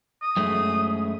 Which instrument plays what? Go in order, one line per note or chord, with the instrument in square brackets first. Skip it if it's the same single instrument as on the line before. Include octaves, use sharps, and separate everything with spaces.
[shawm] D#6
[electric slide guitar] F#2 G#3 A3